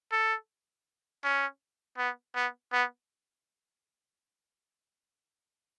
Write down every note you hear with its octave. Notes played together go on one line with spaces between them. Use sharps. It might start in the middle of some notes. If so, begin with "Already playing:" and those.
A4
C#4
B3
B3
B3